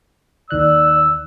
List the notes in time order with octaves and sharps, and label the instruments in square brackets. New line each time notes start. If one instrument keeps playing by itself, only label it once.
[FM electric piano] D#2 D#3 F#6 [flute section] D5 [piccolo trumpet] E6